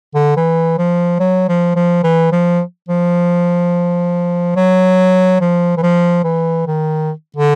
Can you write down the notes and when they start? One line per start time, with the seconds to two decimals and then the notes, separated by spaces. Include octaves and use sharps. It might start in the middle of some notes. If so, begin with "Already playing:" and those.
0.15 D3
0.37 E3
0.78 F3
1.19 F#3
1.49 F3
1.76 F3
2.03 E3
2.32 F3
2.89 F3
4.56 F#3
5.41 F3
5.77 E3
5.83 F3
6.24 E3
6.67 D#3
7.36 D3